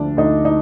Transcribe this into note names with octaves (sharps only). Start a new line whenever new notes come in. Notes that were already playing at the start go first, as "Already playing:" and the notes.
Already playing: D2 D3 F3 D4
D2 D#4
D#4